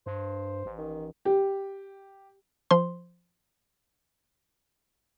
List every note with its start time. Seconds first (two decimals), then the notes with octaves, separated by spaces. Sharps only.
0.06 G2 C5
0.65 A1
0.78 D#3
1.25 G4
2.71 F3 C5 C6